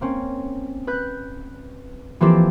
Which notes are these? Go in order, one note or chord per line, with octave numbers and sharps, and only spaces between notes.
A#3 C4 C#4
B4 F#6 G6
E3 F3 A#3 C4 G4 A4